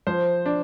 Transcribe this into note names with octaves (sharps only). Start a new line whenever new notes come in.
F3 C5
D4